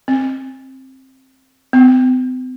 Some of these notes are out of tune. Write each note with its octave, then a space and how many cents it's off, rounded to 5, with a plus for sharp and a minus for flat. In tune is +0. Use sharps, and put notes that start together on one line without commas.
C4 +15
C4 -45